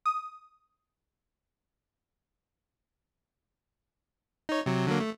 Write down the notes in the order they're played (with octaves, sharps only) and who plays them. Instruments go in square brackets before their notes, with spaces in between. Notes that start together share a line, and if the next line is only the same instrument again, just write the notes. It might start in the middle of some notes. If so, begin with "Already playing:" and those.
[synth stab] D#6
[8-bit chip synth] D#4 C#5
C3 F#3
D3 F#3 A#3
A3